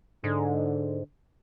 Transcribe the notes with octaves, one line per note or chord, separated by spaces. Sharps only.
G#2 D3